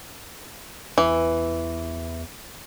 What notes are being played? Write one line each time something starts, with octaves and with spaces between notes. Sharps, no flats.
E2 E3